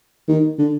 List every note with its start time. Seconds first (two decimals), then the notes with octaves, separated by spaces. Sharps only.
0.28 D#3
0.59 D3